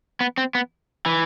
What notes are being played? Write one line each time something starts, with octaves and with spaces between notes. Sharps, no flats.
B3
C4
B3
E3